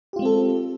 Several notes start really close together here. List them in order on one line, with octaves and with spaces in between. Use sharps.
G4 F4 G#3 C4 A4